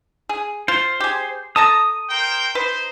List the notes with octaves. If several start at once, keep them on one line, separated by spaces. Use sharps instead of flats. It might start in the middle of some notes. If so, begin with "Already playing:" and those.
G#4
F4 C5
G4 G#4
A4 A5 A#5 D#6
A#4 C5 G5
D#4 B4 C5